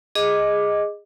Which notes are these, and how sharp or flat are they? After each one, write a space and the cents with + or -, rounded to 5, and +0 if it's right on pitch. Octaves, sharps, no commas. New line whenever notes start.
G#4 -10 D#5 +0 D6 +0